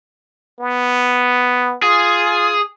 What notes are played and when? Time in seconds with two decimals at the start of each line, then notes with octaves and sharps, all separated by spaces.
0.60 B3
1.83 F4 G#4